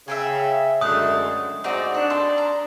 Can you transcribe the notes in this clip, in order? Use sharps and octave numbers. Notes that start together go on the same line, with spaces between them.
C#3 E5 G5 G#5
F#2 D3 G#3 A3 C#5 D#6 F#6
G#2 C4 D#4 F#4 D5
D4 F#6
C4 A4 C6
A#5